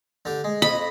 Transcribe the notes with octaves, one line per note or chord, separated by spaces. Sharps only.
D3 G4
G#3
F2 D#5 B5 D#6